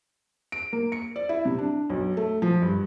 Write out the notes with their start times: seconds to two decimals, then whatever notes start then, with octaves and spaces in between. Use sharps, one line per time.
0.52 D7
0.73 A#3
0.92 C#7
1.16 D5
1.29 E4
1.45 C3
1.58 D4
1.90 B1
2.17 A3
2.42 F3
2.62 G2